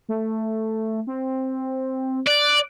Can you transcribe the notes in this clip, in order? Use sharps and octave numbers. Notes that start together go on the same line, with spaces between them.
A3
C4
D5 F#6